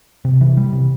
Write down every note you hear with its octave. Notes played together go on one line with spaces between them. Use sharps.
C3
E3
G3
C3